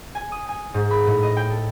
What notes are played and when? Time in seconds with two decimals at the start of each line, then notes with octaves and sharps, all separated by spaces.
0.15 G#5
0.32 D#6
0.49 G#5
0.74 G#2
0.91 B5
1.07 A2
1.23 D#5
1.37 G5
1.50 A4